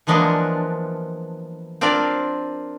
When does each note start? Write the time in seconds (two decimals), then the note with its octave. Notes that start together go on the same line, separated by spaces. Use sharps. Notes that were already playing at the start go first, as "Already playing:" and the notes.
0.07 E3 F3 G#3 A#3 B3 D4
1.81 C4 D4 F4 A#4 D5